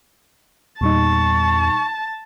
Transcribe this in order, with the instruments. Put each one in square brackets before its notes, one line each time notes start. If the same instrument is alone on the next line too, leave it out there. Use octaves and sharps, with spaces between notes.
[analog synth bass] E2 [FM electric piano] A#2 G3 D#4 [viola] A5 [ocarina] C#6